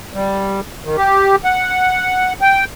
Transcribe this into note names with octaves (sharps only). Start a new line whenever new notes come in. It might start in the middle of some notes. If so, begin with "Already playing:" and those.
G3
D#3
G4
F#5
G5